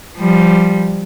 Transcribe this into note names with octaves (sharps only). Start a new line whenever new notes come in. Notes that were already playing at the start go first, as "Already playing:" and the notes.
F3 G3